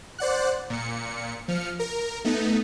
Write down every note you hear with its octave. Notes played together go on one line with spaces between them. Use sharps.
C5 D5 F#5 F#6
A#2 C#7
F3 F6 C#7
A#4
A3 B3 D#4